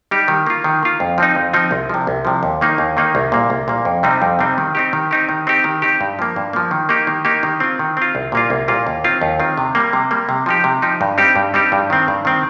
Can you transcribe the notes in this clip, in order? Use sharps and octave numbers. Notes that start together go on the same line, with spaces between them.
G3 D#4 G4
D#3
A#3 F4
D#3
A#3 F4
F2
F3 C4 D#4
F2
F3 C4 D#4
C2
C3 F3
C2
C3 F3
D#2
D#3 A#3 D#4
D#2
D#3 A#3 D#4
C2
A#2 A#3
C2
A#2 A#3
F2
C3 G3 C4 D#4
F2
C3 G3 C4 D#4
D#3
C4 D#4 G4
D#3
C4 D#4 G4
D#3
C4 D#4 G4
D#3
C4 D#4 G4
G2
F3 A#3
G2
F3 A#3
D#3
A#3 D#4 G4
D#3
A#3 D#4 G4
D#3
C4 F4
D#3
C4 F4
C2
A#2 A#3 F4
C2
A#2 A#3 F4
D#2
D#3 C4 F4
D#2
D#3 C4 F4
C3
G3 A#3
C3
G3 A#3
C3
F3 D#4 G4
C3
F3 D#4 G4
G2
G3 C4 D#4 G4
G2
G3 C4 D#4 G4
G2
D#3 C4
G2
D#3 C4